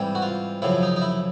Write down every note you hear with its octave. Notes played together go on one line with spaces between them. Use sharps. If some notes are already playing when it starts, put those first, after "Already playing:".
Already playing: G#2 E3 G3 C4
F#4
F4
F#2 C#3 F3 E4
D#4
D#4
E4